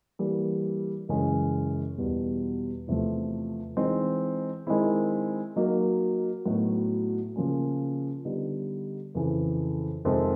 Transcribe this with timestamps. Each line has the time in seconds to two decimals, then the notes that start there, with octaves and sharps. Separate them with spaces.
0.19 E3 G3 A#3
1.09 F#2 C#3 E3 G#3 C#4
1.98 E2 B2 G3 B3
2.87 E2 C3 F3 A3
3.77 E3 G#3 C4 D#4
4.67 D#3 G#3 C4 E4
5.56 F#3 A#3 D#4 F#4
6.46 A2 F#3 B3 D#4 F#4
7.35 C#3 F3 A#3 C#4 F4
8.25 D3 G3 B3 D#4
9.15 F2 C#3 E3
10.05 F2 C3 D#3 G#3 C4